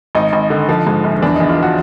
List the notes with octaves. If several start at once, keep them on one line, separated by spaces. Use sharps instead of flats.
G#1 D#4
G#1
D3
F3
G#2
A#1
E2 D4
E2 D#4
F4
F3 F#4